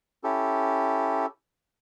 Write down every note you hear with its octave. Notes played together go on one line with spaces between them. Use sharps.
C#4 E4 G4 A4